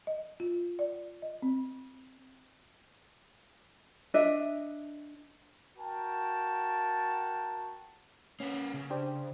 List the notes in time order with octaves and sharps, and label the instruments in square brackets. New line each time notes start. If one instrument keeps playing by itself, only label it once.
[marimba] D#5
F4
D5
D#5
C4
[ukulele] D4 D#5 E5
[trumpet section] F#4 A#4 G5 A5
[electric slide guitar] A#3 B4 [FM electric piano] C#4
[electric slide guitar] C#3
[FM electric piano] D4 G4 C5